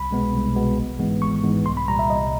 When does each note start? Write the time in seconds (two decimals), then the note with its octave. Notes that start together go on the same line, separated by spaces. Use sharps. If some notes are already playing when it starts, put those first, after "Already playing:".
Already playing: C2 B5
0.11 B2 G#3 B3
0.33 C2
0.55 B2 G#3 B3
0.78 G#1
0.99 G#2 E3 G#3 B3
1.21 G#1 C#6
1.44 G#2 E3 G#3 B3
1.65 C2 C6
1.77 B5
1.88 A#2 G3 A#5
1.99 E5
2.10 C2 D#5